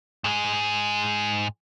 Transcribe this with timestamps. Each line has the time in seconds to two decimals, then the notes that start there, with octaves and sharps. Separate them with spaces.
0.24 G#2 G#3